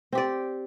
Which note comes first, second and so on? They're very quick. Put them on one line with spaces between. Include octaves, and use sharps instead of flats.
C4 G4 D5